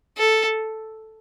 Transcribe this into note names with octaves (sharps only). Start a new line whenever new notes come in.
A4